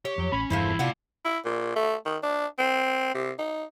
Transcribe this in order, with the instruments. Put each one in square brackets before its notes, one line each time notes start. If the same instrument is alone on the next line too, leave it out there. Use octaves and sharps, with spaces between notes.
[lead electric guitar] G4 [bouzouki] C#5
[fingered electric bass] F2 [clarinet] F#3
[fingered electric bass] A1 [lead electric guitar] C#4 [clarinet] B5
[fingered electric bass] E1 G2 [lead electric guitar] E3 G#4 [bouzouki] F3 A3 C4 [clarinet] E4
[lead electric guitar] A2 F#5 [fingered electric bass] C3 [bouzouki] B3 D4 F4
[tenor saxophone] E4
A#2
A3
D#3
D4
C4
C3
D#4